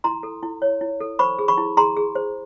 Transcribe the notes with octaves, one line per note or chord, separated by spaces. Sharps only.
E4 A#5 C6
A4
E4
C#5
E4
A4
C5 B5 C#6
G#4
B5 C#6
E4
G#4 A#5 C6
G#4
C5